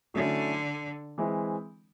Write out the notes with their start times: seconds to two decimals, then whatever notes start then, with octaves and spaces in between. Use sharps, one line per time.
0.14 D3 F#3 A3 C#4 E4
1.18 E3 G#3 C4 E4